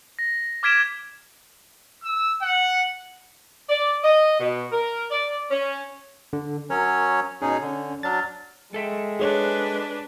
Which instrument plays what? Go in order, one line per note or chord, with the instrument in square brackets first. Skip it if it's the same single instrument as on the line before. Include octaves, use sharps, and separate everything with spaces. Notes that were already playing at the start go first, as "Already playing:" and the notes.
[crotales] A#6
D6 F6 G#6 B6 D7 E7
[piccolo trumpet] E6
F#5
[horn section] D5
D#5
B2
A#4
D5
C#4
[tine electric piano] D3
[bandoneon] F#3 C#4 C#5 [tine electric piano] A#4
[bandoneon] B2 D#4 G#4 [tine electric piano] C#4
[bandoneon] D3
[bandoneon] F#3 D4 [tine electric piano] F6 A6
[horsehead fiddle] G#3 [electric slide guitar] A4 E5 G5
[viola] D4 B4 [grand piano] G#4 C#5